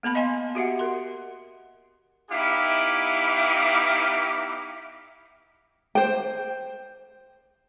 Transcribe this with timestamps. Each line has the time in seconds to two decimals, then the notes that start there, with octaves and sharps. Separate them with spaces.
0.03 A#3 B3 A5 B5
0.15 D#5 F5 G#5 C6
0.55 F#4 G4 E5 F#5
0.79 A#4 C6
2.30 B3 D#4 E4 G4 F5 D6
5.95 C5 G5